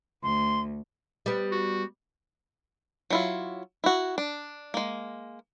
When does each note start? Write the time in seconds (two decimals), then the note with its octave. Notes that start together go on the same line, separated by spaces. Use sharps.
0.23 D2 C6
1.26 G3 B3
1.52 F#4
3.10 F#3 E4 F4
3.84 E4 F#4
4.18 D4
4.74 G#3 A#3